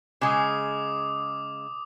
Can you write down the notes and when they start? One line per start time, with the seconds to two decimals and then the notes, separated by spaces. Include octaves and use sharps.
0.21 C#3 G#3 D6 D#6